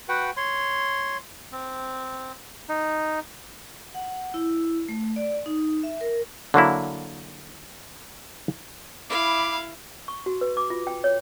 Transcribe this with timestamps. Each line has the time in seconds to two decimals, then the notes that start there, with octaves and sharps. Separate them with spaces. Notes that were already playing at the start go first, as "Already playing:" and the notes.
0.09 F#4 B4 F#5 G5
0.37 C#5 C6
1.52 C4
2.69 D#4
3.94 F#5
4.34 E4
4.89 A3
5.16 D5
5.46 D#4
5.83 E5
6.01 A#4
6.54 D3 F#3 A#3 E4
9.10 E4 F5 B5 D6
10.08 C#6
10.26 F#4
10.41 B4
10.57 D6
10.70 F4
10.87 G5
11.04 C#5